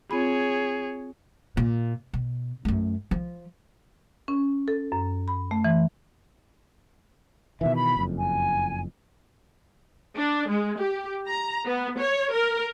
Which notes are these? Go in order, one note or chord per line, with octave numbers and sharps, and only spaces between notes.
C4 F4 G#4 C#5 B5
A#2
B2
F#2 A3
F3
C#4
A4
F#2
B5
A3
E3
B2 D#3 E3 E5
B5
F#1 F2
G#5
D4
G#3
G4
A#5
B3
C#5
A#4